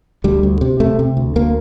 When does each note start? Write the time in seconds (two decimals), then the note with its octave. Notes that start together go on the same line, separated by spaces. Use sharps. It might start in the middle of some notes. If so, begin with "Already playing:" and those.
0.24 D2 G3
0.43 D2
0.61 C3
0.80 C3 A3
0.99 C3
1.17 D2
1.36 D2 A#3